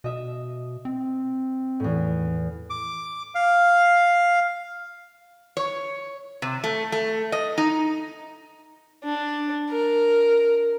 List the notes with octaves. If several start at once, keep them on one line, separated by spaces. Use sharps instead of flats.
B2 D#5 E5
C4
E2 A2
D6
F5
C#5
C3
A3
A3
D#5
D#4
D4
A#4